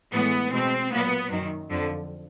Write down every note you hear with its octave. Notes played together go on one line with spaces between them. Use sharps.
A2 E3 G#3 B3
B2 G#3 C4
A#2 F#3 A#3 B3
F#2 D#3 F#3
F2 D3 F3